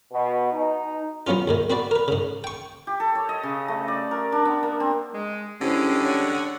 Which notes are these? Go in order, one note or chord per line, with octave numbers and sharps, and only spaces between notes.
B2
D#4
F3 F#3 B3 C#4 F4
D#2 G#2 D#3
C4 F#4 B4 D5
A#4 B4
G#2 C#3
G5 C#6
G4
A4
C#5
D#5
C#3
A3
D5
A#4
D4
B3
A#3
C4
G#3
D3 G3 G#3 C#4 E4 G4 C5
C#5 F#5